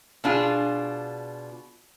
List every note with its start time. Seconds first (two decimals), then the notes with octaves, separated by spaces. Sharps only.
0.24 B2 D4 F4 G#4